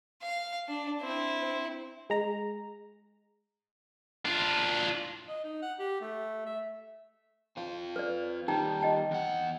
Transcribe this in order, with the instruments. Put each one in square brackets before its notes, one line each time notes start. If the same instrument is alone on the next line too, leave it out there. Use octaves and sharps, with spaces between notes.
[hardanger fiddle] F5
D4
C4 E4
[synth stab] G#3 A#5
[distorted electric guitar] D4 F4
[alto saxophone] D#5
D#4
F#5
G4
A3
E5
[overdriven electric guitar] C4 F4
[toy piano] B4 D5
[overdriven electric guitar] D#2 G3 [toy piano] D#4 G5 A#5
[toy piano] D#5 G5 A5
[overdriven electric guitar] E2 F#5